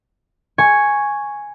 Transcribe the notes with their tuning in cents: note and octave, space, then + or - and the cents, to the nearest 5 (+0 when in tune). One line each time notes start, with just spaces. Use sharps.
G#5 +0 C#6 +0